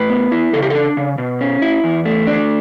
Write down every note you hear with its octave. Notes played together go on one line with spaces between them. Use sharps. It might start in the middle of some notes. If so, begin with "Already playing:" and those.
Already playing: A2 B4
B3
E4
C#3 A4
G4
D4 A4
C#3
B2
C#4
E4
E2
A3
D4